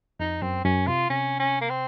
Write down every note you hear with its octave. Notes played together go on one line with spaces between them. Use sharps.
F2 D#4
F#2 C4
F#2 C#4
C3 F4
C3 C#4
C#4
A#3
C4